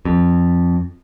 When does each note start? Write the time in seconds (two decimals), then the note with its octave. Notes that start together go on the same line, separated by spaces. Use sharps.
0.05 F2